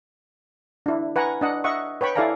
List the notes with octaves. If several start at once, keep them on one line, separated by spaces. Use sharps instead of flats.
D4 E4
B4 F#5 G#5 A#5
D4 D#5 F#5
D#5 E5 F#5 C#6
B4 C#5 G5 B5 C#6
E4 A4 D5 F5 G#5 A#5